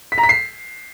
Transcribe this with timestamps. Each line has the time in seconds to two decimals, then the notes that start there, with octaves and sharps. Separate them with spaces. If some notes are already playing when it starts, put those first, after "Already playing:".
0.12 B6
0.18 A#5
0.23 B6
0.29 C7